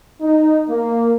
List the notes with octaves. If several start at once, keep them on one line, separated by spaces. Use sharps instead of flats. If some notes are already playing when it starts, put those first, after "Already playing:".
D#4
A#3